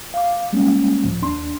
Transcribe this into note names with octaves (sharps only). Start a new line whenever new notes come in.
F5 D6
G3 G#3 A#3 C#4
C#2 A2 F3
D#2 D4 C6